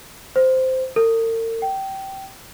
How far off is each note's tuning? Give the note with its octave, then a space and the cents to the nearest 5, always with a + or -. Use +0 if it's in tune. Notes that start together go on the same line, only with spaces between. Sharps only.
C5 -10
A#4 -45
G5 -20